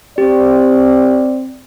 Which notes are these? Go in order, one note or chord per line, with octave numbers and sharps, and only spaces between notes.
C4 G4 D5